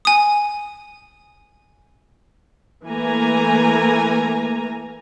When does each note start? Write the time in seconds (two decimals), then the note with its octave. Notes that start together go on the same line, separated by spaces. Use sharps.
0.05 G#5 D#6
2.87 E3 A3 A#3 G#5 A#5